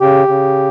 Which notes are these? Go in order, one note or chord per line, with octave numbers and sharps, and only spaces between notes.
C#3 G4
C#3